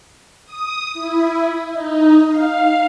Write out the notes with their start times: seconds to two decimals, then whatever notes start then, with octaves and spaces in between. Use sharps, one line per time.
0.45 D#6
0.93 E4
1.72 D#4
2.29 F5